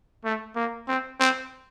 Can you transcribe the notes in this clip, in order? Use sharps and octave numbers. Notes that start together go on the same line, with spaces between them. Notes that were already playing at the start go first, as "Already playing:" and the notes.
A3
A#3
C4
C4